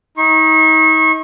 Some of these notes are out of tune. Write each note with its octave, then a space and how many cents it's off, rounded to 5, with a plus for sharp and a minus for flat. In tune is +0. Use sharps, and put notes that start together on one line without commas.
D#4 +35 C#6 -30